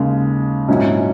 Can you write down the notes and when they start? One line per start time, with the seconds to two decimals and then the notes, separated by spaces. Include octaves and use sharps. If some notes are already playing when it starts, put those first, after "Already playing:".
Already playing: D#2 C#3 G#3
0.68 A#1 G#2 F#3 C#4 E4